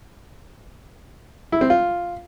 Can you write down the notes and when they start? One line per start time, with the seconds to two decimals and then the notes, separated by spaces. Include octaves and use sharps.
1.52 E4
1.61 C4
1.70 F4